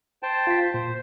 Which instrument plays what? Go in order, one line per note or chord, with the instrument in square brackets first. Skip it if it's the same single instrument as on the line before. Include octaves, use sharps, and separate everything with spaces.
[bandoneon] C5 G5 A5
[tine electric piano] F4 B6
[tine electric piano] A#2 [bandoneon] C5